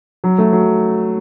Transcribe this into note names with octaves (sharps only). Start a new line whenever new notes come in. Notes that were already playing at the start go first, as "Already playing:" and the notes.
F#3
A3
F#3